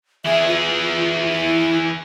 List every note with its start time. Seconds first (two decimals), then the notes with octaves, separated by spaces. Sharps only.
0.25 E3 G#4 E5
0.48 F4
1.30 E4